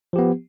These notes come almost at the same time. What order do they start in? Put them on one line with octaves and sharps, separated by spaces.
F3 G4 B3